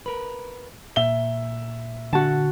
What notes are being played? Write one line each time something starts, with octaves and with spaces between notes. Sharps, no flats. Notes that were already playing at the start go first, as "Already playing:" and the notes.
A#4 B4
A#2 E5 G7
D3 F#4 A5